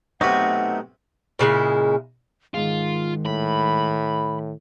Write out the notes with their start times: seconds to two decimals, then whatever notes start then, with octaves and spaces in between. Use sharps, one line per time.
0.21 B1 C3 A3 D#4 F#4 B4 F#5
1.39 A#2 C#3 G#3 E4
2.54 G#2 D#3 G#3 F4
3.25 A2 B5